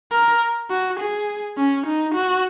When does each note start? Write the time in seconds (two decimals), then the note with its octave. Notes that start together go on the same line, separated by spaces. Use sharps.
0.12 A#4
0.71 F#4
1.00 G#4
1.58 C#4
1.87 D#4
2.15 F#4